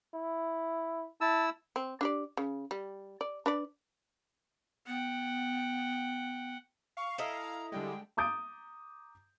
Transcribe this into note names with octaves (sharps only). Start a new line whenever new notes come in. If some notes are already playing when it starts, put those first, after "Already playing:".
E4
E4 A5 E6
C4
D4 G4 D5
C#3
G3
D5
D4 B4 D5
B3 F#5 G5
F5 C#6
E4 A4 D#5 A#5
D3 G3 G#3 G5
A#5 D6 D#6 G6 A6 D7